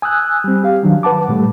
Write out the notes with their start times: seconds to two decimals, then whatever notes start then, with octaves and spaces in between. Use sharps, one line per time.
0.02 G#5 D#6 E6 F#6 G6
0.44 G3 C4
0.64 G4 F5
0.83 D#3 F#3 D4
1.03 B4 F#5 A5 D6
1.29 A2 G3 A3